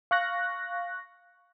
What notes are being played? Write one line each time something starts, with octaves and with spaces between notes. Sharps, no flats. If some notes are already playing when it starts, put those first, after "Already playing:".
F5 C#6 F#6 A#6